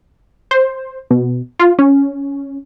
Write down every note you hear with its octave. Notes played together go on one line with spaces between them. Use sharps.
C5
B2
F4
C#4